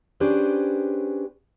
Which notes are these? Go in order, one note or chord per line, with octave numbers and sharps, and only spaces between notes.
C#4 D4 G4 G#4 B4 C5